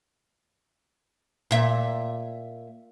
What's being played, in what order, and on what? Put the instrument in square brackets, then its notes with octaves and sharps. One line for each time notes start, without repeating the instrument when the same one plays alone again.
[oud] A#2 E5